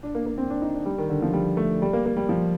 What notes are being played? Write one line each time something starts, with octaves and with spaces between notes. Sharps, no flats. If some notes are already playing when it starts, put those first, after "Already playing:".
D4
A#3
A#3
C4
D4
D#4
D4
G3
D#3
D3
F3
G3
A3
G3
A#3
A#3
G3
F3